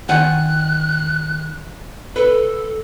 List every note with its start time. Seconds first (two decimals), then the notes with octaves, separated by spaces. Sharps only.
0.09 D#3 F#5 G#5 F#6
2.16 A4 B4